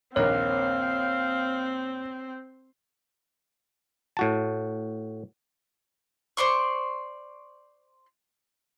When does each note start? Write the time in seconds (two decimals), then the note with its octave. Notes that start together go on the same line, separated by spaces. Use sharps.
0.16 A#1 D#2 C4 A#4 C#5 F5
4.17 A2 F#4 A5
6.37 C5 D5 C6 C#6